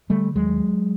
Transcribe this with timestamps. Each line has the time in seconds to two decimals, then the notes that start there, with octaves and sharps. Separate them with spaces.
0.09 D3 G3 A3
0.36 D#2 F#3 G#3